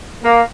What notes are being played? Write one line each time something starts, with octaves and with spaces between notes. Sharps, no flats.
A#3